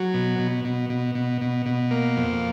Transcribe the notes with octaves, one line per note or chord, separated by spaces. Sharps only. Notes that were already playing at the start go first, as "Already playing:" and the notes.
Already playing: F#3
B2
B2
B2
B2
B2
B2
B2
A#3
F2